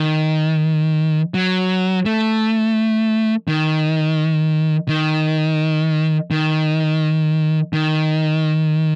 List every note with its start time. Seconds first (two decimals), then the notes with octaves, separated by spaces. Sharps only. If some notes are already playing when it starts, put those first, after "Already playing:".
Already playing: D#3
1.34 F#3
2.06 A3
3.48 D#3
4.88 D#3
6.31 D#3
7.73 D#3